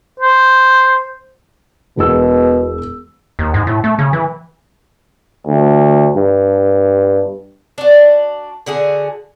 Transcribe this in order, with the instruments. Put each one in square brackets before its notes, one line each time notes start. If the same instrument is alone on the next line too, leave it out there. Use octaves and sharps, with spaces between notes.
[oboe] C5
[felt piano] E1 G#4 E6 [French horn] B2
[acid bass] D#2
G#2
A2
A3
C#3
E3
[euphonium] D2
G2
[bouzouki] D4 F#4
D3 F#4 G#4